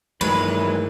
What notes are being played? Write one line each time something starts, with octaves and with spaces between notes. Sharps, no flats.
G2 D#3 E3 F#3 G#3 B4